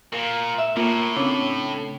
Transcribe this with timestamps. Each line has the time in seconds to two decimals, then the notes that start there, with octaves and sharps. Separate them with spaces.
0.13 A#2 A#4
0.58 E5
0.77 A2 A#3 F4
1.17 C#3 C4 D4